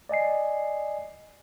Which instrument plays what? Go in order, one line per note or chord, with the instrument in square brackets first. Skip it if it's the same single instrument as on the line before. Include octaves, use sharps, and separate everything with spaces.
[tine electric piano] D5 D#5 G#5 C7